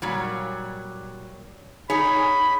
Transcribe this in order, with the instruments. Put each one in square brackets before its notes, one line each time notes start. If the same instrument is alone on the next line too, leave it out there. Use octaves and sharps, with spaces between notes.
[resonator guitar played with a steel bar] A#2 F#3 G3
[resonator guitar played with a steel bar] D#4 G#4 C#5 [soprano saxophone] B5